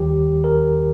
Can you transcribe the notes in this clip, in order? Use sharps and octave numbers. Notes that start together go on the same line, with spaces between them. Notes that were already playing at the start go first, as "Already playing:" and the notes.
Already playing: D#2 D#3 G3 G4
A#4